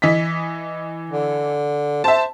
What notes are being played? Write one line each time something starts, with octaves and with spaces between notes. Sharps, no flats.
E3 D#5 B6
D3
C5 E5 A5